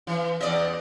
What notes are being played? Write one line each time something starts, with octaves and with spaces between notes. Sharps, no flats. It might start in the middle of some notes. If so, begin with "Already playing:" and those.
E3
E2 D5 D#5